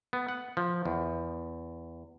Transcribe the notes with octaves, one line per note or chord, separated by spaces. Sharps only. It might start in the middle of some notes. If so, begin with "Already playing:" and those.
B3
F#5
F3
E2